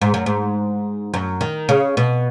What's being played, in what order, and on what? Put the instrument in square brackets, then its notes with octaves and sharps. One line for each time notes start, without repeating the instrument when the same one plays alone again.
[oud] G#2
F#2
G#2
F#2
D#3
C#3
B2